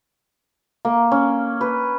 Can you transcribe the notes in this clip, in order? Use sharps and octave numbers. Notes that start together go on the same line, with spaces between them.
A#3
C#4
B4